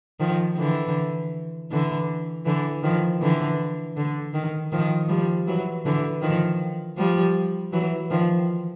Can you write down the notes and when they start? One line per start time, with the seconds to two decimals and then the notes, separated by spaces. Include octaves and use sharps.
0.20 D#3 F3
0.57 D3 E3
1.71 D3 E3
2.45 D3 E3
2.83 D#3 F3
3.21 D3 E3
3.97 D3
4.34 D#3
4.72 D#3 F3
5.09 F3 G3
5.47 E3 F#3
5.85 D3 E3
6.22 D#3 F3
6.97 F3 G3
7.73 E3 F#3
8.11 D#3 F3